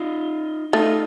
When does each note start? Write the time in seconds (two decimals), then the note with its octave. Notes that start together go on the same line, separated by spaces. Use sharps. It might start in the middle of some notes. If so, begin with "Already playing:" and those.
Already playing: D#4 F4
0.73 A3 D#4 F4